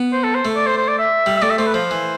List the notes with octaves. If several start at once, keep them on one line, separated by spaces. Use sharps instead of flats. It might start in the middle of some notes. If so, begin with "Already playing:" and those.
Already playing: B3
C5
A4
C5
A3
D5
C5
C5
D5
E5
G3
E5
A3 D5
E5
A3 C5
B4
F3 C5
E3